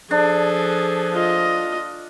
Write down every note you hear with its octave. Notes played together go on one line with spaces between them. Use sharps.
F3 D4 G#4 A4
F4 D#5